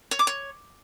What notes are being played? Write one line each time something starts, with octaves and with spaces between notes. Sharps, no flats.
C#5
D6
C#5